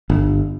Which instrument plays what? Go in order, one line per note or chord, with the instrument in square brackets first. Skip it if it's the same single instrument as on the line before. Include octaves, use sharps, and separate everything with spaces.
[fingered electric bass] G1